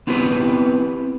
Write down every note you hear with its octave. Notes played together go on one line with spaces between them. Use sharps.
B3 C4 E4 G4 B4